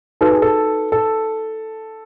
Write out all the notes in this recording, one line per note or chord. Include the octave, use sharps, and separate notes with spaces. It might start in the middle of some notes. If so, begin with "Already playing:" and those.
D#4 F#4 A4 B4
G#4
A4
A4